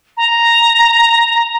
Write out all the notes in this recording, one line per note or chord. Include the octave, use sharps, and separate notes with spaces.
A#5